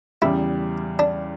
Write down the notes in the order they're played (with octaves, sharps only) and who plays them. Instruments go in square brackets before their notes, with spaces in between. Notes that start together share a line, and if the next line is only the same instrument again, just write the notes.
[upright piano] E2 C#3 G3 [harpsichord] E4
[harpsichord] D4